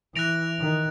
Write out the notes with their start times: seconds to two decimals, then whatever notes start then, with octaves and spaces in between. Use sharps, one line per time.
0.15 E3 F#6 A#6 D7 F7
0.60 D#3